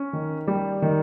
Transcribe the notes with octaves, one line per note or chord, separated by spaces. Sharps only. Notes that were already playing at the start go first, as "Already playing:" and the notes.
Already playing: C#4
D#3
G3
D#3